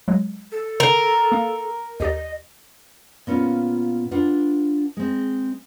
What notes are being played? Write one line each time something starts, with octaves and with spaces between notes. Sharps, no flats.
F#3 G#3
A4
D3 A#4
A#3 F5
D#2 G4 D5 D#5
A#2 B3 C#4 F4
D4 F4 B4 F#5
G#3 C4